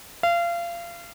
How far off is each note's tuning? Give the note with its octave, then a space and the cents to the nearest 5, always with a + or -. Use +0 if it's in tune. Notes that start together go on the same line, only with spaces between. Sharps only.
F5 -30